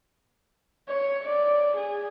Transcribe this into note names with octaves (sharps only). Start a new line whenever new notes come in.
C#5
D5
G#4